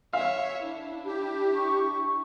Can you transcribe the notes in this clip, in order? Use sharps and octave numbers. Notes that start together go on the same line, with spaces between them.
C#5 E5 F5
D4 E4
G4
C#6